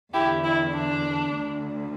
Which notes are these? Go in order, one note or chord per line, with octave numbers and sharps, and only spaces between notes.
E2 D3 E4 G4
E4
D4
D2 D3